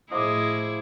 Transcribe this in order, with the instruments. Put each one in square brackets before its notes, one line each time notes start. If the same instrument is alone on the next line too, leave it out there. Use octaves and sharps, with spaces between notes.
[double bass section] A2 [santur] F3 D6 [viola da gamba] E4 G#4 [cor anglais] D#5